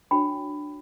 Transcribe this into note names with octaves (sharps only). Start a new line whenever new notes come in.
D4 F#4 C#5 G5 B5